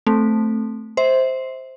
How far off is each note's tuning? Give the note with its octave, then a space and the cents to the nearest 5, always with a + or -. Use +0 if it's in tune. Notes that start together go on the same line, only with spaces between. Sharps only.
A3 +0 C4 +0
C5 +0 E5 -30